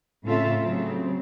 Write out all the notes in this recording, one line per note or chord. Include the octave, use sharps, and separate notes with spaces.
A2 C#3 C4 F4 A4 E5
C#3 F#3 C4